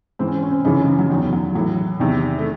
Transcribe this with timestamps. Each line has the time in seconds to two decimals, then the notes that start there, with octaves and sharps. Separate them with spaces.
0.19 G#2 E3 C4
0.27 C#4
0.35 C4
0.42 C#4
0.51 C4
0.65 F#2 C#3 E3 D#4
0.76 C#4
0.88 E3
0.99 F#3
1.10 E2 D#3 F#3
1.33 F#3
1.55 A2 E3 F#3
2.00 E2 C3 D#3
2.39 A3